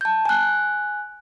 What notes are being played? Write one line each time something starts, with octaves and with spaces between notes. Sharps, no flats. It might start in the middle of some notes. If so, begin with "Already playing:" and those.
A5 G6
G#5 F#6